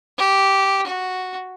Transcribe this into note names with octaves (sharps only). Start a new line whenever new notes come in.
G4
F#4